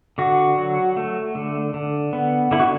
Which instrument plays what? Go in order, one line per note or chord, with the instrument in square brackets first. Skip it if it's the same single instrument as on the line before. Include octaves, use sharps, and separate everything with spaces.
[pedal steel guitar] D3 F#4
F#3
A3
D3
D3
B3
D3 E4
F#4